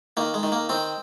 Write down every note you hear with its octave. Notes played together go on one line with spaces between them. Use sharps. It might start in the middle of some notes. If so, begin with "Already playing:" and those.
D#3 A#3
G#3
D#3
A#3
D#3 C4